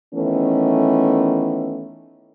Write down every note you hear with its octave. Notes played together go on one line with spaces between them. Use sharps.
D#3 E3 A3 B3 C#4